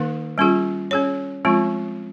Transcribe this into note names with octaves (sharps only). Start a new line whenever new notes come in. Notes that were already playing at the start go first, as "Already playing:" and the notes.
Already playing: D#3 A#3 D#4 A#4
G3 C#4 F4 G#4
C#4 G#4 C#5
F3 G#3 C4 F4